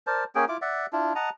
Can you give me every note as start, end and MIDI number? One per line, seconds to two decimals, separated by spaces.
0.07 0.24 70
0.07 0.24 72
0.07 0.24 74
0.07 0.24 81
0.35 0.45 58
0.35 0.45 61
0.35 0.45 68
0.35 0.45 79
0.49 0.57 64
0.49 0.57 65
0.49 0.57 86
0.62 0.86 74
0.62 0.86 76
0.62 0.86 78
0.93 1.13 62
0.93 1.13 64
0.93 1.13 65
1.16 1.30 75
1.16 1.30 78
1.16 1.30 81
1.16 1.30 82